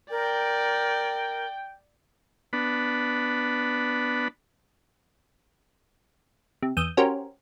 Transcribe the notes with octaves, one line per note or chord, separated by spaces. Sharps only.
A#4 D5 G5
B3 D4 B5
C3
E2 D#6 E6 G6
C#4 F#4 G4 A#4 C5